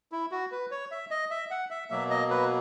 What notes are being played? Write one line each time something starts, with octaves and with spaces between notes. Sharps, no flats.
E4
F#4
B4
C#5
E5
D#5
E5
F#5
E5
B2 F#3 A#3 E5
D#5
B4